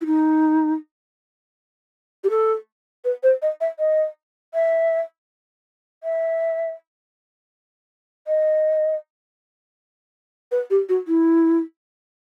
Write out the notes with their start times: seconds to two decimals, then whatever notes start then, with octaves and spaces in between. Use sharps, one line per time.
0.01 E4
0.06 D#4
2.24 G4
2.30 A4
3.05 B4
3.23 C5
3.42 D#5
3.61 E5
3.79 D#5
4.54 E5
6.03 E5
8.27 D#5
10.52 B4
10.70 G4
10.89 F#4
11.08 E4